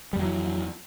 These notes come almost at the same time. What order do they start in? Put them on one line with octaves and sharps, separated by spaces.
G3 F2 F#3 E3